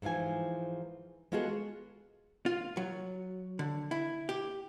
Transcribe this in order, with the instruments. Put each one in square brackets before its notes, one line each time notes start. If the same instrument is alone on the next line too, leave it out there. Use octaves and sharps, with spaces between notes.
[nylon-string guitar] G#2 E3 F3 F5 G#5
G#3 B3 F4 F#4 G#4 A4
[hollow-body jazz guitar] F4
F#3
D3
E4
G4